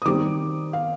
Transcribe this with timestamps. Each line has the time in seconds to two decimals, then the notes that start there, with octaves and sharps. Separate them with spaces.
0.02 D#6
0.05 D#3 G3 C4 D6
0.73 F5